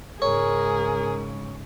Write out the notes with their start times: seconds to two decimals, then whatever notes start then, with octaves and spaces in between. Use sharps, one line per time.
0.22 G#2 C#3 G#4 A#4 C#5